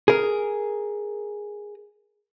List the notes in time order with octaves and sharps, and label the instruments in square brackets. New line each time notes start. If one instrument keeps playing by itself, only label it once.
[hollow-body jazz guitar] G#4 A#4